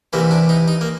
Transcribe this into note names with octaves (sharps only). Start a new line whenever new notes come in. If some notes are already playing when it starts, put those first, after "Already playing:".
C2 C3 E3 A#3
D4
D#4
D#4
A#3